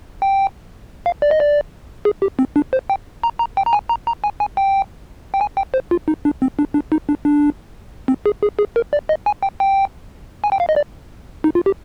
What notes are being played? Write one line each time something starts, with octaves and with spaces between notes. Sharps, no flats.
G5
F5
D5
D#5
D5
G#4
G4
C4
D4
C5
G5
A#5
A#5
G5
A#5
G#5
A#5
A#5
G#5
G#5
G5
G5
G#5
G5
C5
F4
D#4
D4
C4
D4
D4
D#4
D4
D4
C4
G#4
G#4
G#4
A#4
D5
D#5
G#5
G5
G5
G#5
G5
F5
D#5
D5
D#4
F4
G4